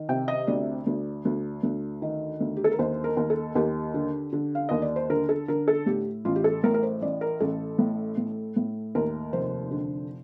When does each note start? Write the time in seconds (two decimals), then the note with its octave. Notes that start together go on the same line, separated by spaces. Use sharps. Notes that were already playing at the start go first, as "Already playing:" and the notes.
Already playing: D#3
0.09 C3 G5
0.28 D#5
0.47 D2 D5
0.86 D2
1.25 D2
1.63 D2
2.02 D#3
2.40 D2
2.57 G4
2.64 A4
2.72 A#4
2.79 D#2 C5
3.04 A#4
3.17 D#2
3.30 A4
3.55 D#2 G4
3.94 D3
4.33 D3
4.55 F5
4.69 D#2 D#5
4.82 D5
4.96 C5
5.10 D3 A#4
5.29 A4
5.48 D3 A#4
5.68 A4
5.86 A2 G4
6.25 A1 F4
6.36 G4
6.44 A4
6.64 A2 A#4
6.74 A#4
6.83 C5
7.02 A1 D5
7.21 A#4
7.40 A1 A4
7.79 A2
8.17 A2
8.56 A2
8.95 D#2 A#4
9.33 F1 C5
9.71 D3